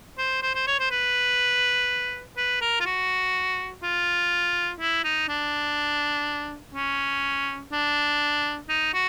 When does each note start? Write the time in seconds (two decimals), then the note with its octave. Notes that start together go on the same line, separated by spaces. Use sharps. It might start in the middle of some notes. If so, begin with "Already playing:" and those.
0.18 C5
0.42 C5
0.55 C5
0.67 C#5
0.79 C5
0.91 B4
2.37 B4
2.62 A#4
2.80 F4
2.86 F#4
3.83 F4
4.80 E4
5.04 D#4
5.29 D4
6.75 C#4
7.72 D4
8.69 D#4
8.94 F#4